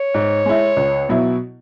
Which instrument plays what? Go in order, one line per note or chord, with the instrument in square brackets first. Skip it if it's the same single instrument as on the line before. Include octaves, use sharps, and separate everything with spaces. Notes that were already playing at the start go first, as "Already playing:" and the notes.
Already playing: [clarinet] C#5
[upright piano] G#2
G#3 E4
C#2
B2 F#3 E4